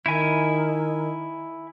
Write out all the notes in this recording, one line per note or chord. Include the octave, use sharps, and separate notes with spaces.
D#3 E4 G#5